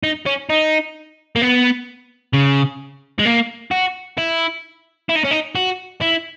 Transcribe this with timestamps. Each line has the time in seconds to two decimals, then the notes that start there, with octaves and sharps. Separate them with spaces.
0.03 D#4
0.26 C#4
0.49 D#4
1.36 A#3
1.42 B3
2.34 C#3
3.19 G#3
3.25 A#3
3.71 F#4
4.18 E4
5.09 E4
5.16 D#4
5.24 C#4
5.31 D#4
5.55 F#4
6.01 E4